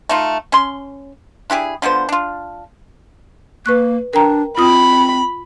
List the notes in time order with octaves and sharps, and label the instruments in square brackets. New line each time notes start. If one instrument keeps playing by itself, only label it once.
[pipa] A3 D#4 F4
C#4 C6
D4 E4 G4 G#4
D3 F3 B3 C5
D4 F4
[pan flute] A#3 [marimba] B4 C#6 F#6
[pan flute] D4 [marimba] A#4 G5 A#5
[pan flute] C4 [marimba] F4 D#6 [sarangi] B5